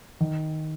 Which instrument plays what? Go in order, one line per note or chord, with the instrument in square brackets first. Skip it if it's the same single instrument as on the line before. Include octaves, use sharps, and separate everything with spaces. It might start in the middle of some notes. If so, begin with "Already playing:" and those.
[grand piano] D#3